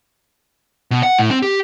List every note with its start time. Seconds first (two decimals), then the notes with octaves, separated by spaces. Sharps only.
0.91 B2
1.03 F#5
1.19 A2
1.31 C4
1.42 G4